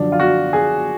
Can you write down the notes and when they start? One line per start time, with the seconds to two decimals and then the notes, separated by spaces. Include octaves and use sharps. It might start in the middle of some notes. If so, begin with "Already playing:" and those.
Already playing: F#2 D3 F3 D4
0.12 F4
0.20 F#4
0.53 G#4